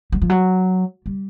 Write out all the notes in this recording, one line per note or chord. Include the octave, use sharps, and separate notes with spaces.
F#3
F3
F#3
G3